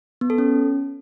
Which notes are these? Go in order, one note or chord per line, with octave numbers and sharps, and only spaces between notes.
B3
A4
C#4